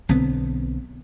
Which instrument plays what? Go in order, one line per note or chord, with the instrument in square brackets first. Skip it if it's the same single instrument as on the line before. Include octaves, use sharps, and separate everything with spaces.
[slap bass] B1 D3 B3 C4